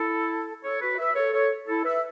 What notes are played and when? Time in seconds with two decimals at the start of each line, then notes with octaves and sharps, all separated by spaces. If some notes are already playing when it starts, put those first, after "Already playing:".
Already playing: E4 A4
0.64 A4 C#5
0.81 F#4 B4
0.98 B4 E5
1.15 A4 C#5
1.33 A4 C#5
1.68 E4 A4
1.85 B4 E5